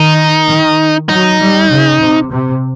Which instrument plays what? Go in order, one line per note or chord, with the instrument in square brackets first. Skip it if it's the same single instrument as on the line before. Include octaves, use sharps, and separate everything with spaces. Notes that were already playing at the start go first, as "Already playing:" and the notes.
Already playing: [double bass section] D#3 [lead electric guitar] D#4
[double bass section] D#3
[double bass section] F#3 [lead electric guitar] D#4
[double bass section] G3
C#3
C3
C3